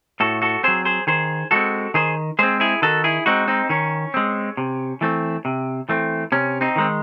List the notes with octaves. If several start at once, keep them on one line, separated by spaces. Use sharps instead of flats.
A2 F#4 A4
F#4 A4
F#3 C4 G#4 C5
G#4 C5
D#3 G#4 C5
G#3 C4 F#4 A4
D#3 G#4 C5
G#3 C4 G#4 C5
E4 G#4
D#3 F#4 A4
E4 G#4
G#3 C4 D#4 F#4
C4 D#4
D#3 C#4
G#3 C4
C3
E3 A3 C4
C3
E3 A3 C4
C3 C#4
C4 D#4
D#3 G#3 C4